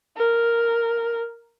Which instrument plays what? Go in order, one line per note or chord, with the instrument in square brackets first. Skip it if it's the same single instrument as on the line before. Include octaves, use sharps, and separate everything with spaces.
[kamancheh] A#4